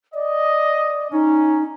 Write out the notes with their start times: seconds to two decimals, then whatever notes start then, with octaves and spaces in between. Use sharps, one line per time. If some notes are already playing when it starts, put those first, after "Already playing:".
0.14 D5 D#5
1.12 C#4 D#4